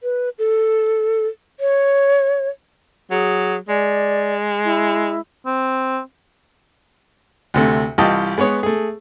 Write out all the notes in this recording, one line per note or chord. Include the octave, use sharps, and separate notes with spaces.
B4
A4
C#5
F#3 G#4
G#3 D5
E4
C4
D2 C3 A3
C2 E3 F4 G4 D#5 A5
G#3 B3 B4 C#5
A3 G#4